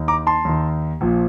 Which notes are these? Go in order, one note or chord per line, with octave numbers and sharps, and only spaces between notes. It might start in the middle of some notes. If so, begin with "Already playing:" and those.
Already playing: D#2 D#3
A#5 D6
A5 C6
D#2 D#3
A#1 A#2 F3